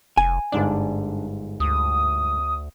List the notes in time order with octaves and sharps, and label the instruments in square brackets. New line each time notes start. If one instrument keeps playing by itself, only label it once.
[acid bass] F1 [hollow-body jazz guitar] G#5
[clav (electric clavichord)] G1 G#2 D5 [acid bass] D4
[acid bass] D2 [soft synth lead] D#6